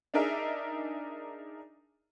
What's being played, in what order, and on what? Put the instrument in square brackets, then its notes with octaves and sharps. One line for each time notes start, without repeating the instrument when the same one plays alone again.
[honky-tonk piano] D4 D#4 G#4 A#4 E5